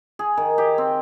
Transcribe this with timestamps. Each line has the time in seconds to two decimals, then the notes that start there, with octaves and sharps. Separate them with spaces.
0.19 G#4
0.37 D#3
0.58 G4
0.78 C4